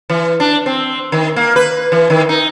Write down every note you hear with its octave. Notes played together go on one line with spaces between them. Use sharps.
E3
D4
C4
D#3
A#3
B4
E3
D#3
D#4